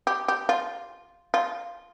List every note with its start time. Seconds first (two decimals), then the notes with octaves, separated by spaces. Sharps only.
0.07 G4
0.28 G4
0.49 F4
1.34 F4